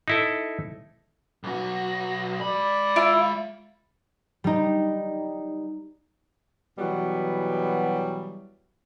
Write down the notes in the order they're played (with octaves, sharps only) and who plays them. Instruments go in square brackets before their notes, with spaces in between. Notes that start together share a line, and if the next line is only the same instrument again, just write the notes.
[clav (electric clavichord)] D#4 E4 A4
[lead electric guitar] B1 F#4
[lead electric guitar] G#3 B5 [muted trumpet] D5
[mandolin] E4 F4
[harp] G3 D#4
[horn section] B2 E3 F#3 G3 B3